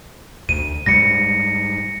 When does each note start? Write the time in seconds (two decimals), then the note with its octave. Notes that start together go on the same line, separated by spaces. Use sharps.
0.49 D2 D#7
0.86 G#2 G3 A#6 C#7